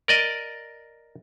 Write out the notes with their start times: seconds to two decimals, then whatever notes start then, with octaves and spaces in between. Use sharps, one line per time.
0.08 A#4 D5 D#5